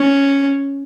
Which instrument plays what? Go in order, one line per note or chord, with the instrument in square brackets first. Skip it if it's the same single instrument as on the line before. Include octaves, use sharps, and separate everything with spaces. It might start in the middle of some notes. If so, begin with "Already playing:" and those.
Already playing: [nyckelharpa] C#4